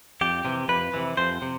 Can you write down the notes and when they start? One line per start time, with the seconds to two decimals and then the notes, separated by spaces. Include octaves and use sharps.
0.21 F2 G4
0.45 C3 E3
0.69 F2 B4
0.94 C3 E3
1.17 F2 C5
1.42 C3